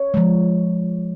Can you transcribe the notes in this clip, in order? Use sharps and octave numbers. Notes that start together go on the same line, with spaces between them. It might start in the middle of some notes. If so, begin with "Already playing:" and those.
Already playing: C#5
F3 G#3